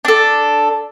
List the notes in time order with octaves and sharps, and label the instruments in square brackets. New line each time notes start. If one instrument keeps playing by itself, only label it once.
[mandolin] D4 A4